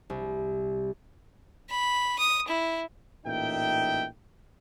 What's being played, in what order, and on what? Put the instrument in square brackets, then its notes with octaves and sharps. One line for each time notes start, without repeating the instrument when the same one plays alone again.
[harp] C2
[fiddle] B5
D#6
E4
[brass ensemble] A1 A#2 D#4 E5 G5